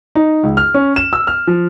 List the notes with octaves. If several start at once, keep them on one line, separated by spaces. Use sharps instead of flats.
D#4
C#2
F6
C#4
E7
E6
F6
F3